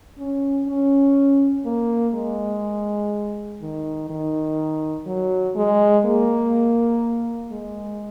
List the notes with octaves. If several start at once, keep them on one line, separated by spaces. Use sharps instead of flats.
C#4
C#4
A#3
G#3
D#3
D#3
F#3
G#3
A#3
G#3